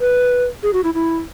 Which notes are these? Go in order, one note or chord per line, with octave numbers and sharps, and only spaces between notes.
B4
G#4
F#4
E4
E4